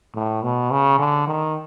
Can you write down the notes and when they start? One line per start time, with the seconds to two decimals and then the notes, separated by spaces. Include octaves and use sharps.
0.15 A2
0.43 B2
0.71 C#3
0.99 D3
1.27 D#3